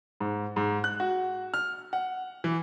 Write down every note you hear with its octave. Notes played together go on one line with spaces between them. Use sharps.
G#2
G#2
F#6
F#4
F6
F#5
E3